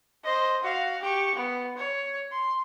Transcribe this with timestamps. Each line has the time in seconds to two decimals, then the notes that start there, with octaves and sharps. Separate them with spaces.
0.24 C5 D#5
0.63 F#4 F5
1.02 G4 C#6
1.35 B3
1.77 C#5
2.32 C6